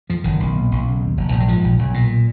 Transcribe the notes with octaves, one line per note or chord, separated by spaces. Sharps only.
F2 F3
F#1 D#3
B1
A#2
B1
C#3
D#2
F1
A#1 F3
F#3
G#2 F3
A#1
B1
A#2